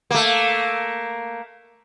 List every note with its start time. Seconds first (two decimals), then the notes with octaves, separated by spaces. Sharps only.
0.11 A3 A#3